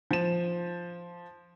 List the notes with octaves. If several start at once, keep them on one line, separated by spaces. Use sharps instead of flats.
F3 E7